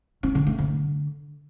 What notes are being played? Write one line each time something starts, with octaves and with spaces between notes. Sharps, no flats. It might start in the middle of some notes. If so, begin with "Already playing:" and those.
C#4
D3
A3
D3